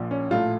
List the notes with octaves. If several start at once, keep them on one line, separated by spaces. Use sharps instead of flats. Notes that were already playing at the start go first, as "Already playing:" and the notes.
Already playing: A#1 A#2 F3
C#4
A#1 A2 A3 F4